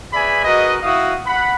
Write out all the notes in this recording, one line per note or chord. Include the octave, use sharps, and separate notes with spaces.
G#4 B4 D5 E5 G#5 B5
F#4 G#4 A#4 B4 D#5
E4 F#4 F5 D#6
F#5 B5